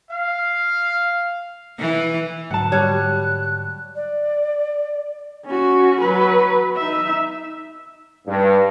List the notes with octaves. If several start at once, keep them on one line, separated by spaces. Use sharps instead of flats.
F5
E3
G#2 D3 F#3 F#5 A5
G3 C#5 F#6
D5
C#4 F#4
F#3 B4
D#4 E5
G2